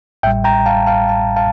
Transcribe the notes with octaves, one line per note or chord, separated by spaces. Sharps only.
A1 A2 G3 E5 G5
G5 A#5
F5 A5
F5 A5
F5 A5
F5 A5